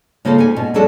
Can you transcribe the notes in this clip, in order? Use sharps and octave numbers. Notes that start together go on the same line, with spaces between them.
C#3 A#3 D#4 F4 A4 C5
C#4 G#5
B2
F3 F#3 G#3 D4 A4